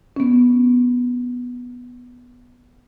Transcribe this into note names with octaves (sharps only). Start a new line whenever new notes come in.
B3 C#4